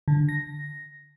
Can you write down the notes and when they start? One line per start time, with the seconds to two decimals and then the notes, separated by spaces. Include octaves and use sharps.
0.08 D3
0.29 A#6